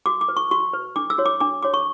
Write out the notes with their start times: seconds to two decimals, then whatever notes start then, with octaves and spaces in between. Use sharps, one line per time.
0.06 F#4 D6
0.21 D6
0.28 B4
0.37 C#6
0.51 F#4 C#6
0.73 B4
0.96 D4 D6
1.10 E6
1.18 F#4 C#5
1.26 D6
1.40 D4 D6
1.63 F#4 C#5 D6
1.74 C#6